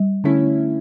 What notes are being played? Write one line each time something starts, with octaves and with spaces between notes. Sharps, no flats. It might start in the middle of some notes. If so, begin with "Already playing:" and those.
Already playing: G3
D3 A3 C#4 E4